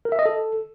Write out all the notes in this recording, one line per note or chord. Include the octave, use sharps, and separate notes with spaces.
A#4
E5
D#5
A4